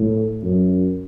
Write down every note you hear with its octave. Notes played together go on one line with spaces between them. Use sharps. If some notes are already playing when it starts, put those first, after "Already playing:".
Already playing: A2
F#2